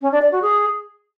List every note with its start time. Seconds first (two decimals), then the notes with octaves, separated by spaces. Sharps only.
0.02 C#4
0.12 D4
0.22 D5
0.32 F#4
0.42 G#4